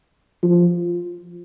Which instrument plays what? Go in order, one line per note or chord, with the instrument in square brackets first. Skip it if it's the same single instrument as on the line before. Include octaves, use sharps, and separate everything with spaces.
[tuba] F3